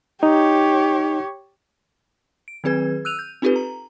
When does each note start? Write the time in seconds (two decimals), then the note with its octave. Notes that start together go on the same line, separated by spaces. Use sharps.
0.23 D#4 G4 C#5
2.48 D7
2.64 D#3 F#3 C4 G#4 B4 G#6
3.05 E6 F#6 D#7 F7
3.19 G6
3.42 C4 D#4 F4 G4 A4 B4
3.56 A#5